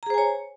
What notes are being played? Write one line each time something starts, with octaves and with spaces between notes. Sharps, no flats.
G#4 C5 C#5 G#5 A#5